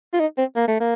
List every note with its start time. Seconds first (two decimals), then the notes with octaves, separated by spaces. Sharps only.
0.14 F4
0.20 D#4
0.38 C4
0.56 A#3
0.68 A3
0.80 A#3